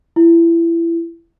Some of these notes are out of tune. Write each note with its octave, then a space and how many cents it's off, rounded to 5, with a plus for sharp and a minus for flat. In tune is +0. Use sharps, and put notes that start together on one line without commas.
E4 +25